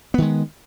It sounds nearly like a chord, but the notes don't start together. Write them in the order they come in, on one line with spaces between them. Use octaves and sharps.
B3 D#3 G#3